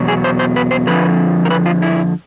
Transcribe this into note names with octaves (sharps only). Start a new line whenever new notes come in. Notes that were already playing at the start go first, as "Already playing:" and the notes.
Already playing: E2 B2 F#3
G#4
C5
C5
B4
C5
F2 D3 F3 B4
A#4
B4
F4
E4